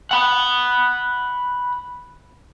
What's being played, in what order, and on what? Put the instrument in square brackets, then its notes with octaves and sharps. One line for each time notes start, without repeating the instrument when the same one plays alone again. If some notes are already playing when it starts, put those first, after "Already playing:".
[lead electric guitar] F#5 B5